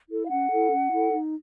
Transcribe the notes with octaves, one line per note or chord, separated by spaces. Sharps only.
E4 A4
F5
C#4 F#5
E4 A4
C#4
E4 A4
D#4